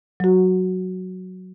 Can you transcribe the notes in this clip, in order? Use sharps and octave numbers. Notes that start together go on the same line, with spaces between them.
F#3 F#4